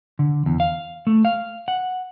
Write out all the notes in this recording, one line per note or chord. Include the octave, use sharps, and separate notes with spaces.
D3
E2
F5
A3
F5
F#5